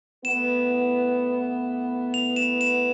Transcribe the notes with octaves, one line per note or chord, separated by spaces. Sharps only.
A2 E3 B3 E7
F7
E7
E7